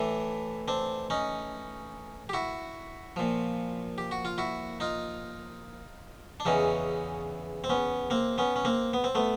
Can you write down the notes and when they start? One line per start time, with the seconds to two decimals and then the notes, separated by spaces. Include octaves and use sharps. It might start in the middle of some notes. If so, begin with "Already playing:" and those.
Already playing: A2 E3 D4 E4
0.68 C4 D4
1.10 C#4 D#4
2.29 G4
2.33 E4 F#4
3.16 A#2 F3
3.98 G4
4.11 F#4
4.25 F4
4.38 E4 F#4
4.80 D#4 F4
6.40 D4
6.45 E2 C#3 E3 C#4 D#4
7.64 C4
7.69 B3 C#4
8.10 A#3 C4
8.38 B3 C#4
8.56 C#4
8.65 A#3 C4
8.93 B3
9.04 C4
9.15 A3 B3